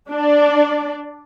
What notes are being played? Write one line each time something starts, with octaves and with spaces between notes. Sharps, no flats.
D4 D5